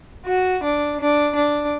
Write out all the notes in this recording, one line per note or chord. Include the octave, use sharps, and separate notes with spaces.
F#4
D4
D4
D4